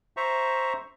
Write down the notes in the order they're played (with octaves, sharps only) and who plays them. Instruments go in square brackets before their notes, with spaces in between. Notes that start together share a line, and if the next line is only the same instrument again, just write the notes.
[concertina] C5 E5 A#5 C#6